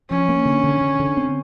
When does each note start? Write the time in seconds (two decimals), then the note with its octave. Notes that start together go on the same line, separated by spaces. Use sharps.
0.10 F3 C#4
0.29 A#3
0.46 D3
0.64 D3
0.81 D3
1.00 D3
1.17 C4